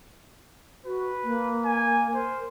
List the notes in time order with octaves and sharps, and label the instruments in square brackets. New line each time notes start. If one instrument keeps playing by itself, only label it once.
[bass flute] F#4 [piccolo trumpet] B4
[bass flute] A#3
[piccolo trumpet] G#5
[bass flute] A#4 [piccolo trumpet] C5